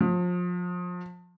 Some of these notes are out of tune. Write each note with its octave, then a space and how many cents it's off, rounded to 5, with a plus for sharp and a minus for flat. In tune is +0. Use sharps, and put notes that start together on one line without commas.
F3 +30